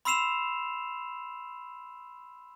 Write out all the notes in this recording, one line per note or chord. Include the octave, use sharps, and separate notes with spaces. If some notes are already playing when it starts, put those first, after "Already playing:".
B5 C6 E6 C7 E7 F7